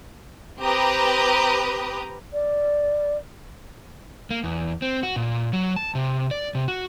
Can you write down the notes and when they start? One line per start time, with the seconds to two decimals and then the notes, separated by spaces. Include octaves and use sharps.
0.60 C4 G4 B4 A#5 D#6
2.33 D5
4.31 A#3
4.44 E2
4.82 C4
5.03 F#4
5.16 A#2
5.53 F#3
5.76 A5
5.95 C3
6.31 D5
6.55 C3
6.68 F#4